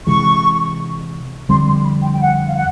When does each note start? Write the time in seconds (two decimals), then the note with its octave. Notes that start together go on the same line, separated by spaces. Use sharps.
0.06 C3 E3 G#3 C#6
1.49 F2 D3 G3 C4 C6
1.67 C6
1.84 B5
2.02 G5
2.13 G5
2.21 F#5
2.48 F5
2.55 F#5